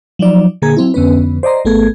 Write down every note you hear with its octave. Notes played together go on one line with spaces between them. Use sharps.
F3 F#3 D#4 D5
A#2 D3 A#3 G#4 A#5 G#6
F#3 C4 E4
F2 D3 B3 C#4 B4
C5 D5 D#5 A#5 C6
G#1 A3 B3 G#4 A4 G#6